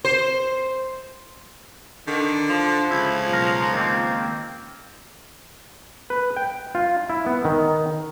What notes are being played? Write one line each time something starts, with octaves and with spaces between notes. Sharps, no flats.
C5
D3 D#3
F3
C#2 E4
B1 A#4
D#3 A#3 C4
B4
G5
F4
E4
B3
D#3